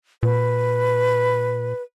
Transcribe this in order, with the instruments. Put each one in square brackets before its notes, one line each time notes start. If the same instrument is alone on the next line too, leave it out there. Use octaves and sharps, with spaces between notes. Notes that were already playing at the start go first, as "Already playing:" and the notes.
[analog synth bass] A#2 [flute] B4